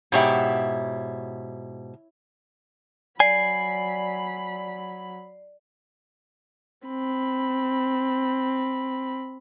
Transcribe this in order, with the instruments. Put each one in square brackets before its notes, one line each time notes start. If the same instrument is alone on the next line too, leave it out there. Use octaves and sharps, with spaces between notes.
[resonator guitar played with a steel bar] G#2 B2 G4 [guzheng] E4 C#5
[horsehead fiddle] F#3 B5 [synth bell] D5 [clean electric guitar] G#5 [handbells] C7
[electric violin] C4 B5